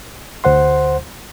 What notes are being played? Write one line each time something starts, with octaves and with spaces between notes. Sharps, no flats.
D2 C5 F#5 C6